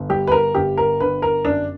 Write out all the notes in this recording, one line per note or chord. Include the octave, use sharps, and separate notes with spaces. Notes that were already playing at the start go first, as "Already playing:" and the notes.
Already playing: G1
G3 G4
B4
A#4
G1 G4
A#4
D3 B4
A#4
F#2 D4